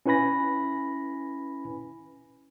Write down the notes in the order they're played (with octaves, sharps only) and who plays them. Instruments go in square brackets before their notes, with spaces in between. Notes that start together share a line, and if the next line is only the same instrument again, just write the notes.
[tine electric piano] C#4 E4 B4 G#5 B5 A#6